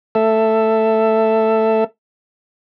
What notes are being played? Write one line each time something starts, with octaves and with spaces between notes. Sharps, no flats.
A3 A4 E5